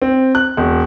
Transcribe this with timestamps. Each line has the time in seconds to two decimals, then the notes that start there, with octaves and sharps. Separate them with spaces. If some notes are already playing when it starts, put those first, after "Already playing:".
0.02 C4
0.35 F#6
0.57 E1